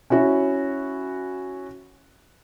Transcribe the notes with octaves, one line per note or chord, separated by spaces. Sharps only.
C#4 E4 F#4 C#5